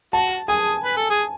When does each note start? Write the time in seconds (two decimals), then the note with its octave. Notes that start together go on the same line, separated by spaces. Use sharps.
0.13 F#4 A5
0.48 G#4 G#5
0.84 B4
0.97 A4
1.10 G#4